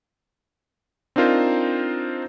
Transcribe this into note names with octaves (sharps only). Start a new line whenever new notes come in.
C4 D4 D#4 F4 A#4 C5